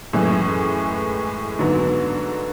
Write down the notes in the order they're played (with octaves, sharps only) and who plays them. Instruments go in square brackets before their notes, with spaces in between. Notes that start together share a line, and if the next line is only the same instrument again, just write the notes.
[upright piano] F#2 [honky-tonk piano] A2 E3 G#3
[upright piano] G#2 [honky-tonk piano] D3 F#3 B3